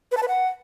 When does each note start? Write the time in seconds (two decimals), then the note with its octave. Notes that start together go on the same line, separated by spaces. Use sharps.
0.12 B4
0.17 A5
0.23 B4
0.28 F#5